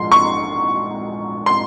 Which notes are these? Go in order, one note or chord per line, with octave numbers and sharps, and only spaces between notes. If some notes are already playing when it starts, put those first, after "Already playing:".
Already playing: A#1 G#2 F3 G#3 C6
C#6
C6